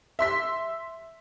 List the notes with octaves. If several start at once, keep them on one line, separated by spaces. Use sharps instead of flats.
E5 C6 B6